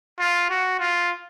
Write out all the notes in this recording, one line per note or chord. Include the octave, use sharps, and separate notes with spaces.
F4
F#4
F4